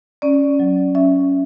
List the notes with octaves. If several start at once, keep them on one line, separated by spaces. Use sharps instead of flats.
C#4 D5
F#3
C#4 E5